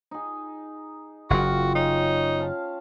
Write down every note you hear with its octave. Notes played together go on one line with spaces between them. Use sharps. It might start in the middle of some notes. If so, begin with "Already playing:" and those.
D#4 G#4
F#1 F#2 F4 F#4 G5
C#4 D#4 C#5
F5 A5